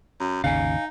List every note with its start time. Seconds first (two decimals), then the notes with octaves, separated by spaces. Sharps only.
0.20 F#2
0.44 G#1 D#2 C#3 D#4 F5 G#5